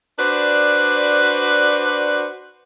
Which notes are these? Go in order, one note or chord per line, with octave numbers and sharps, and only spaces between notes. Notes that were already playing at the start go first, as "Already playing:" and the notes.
D4 F#4 B4 C5 D5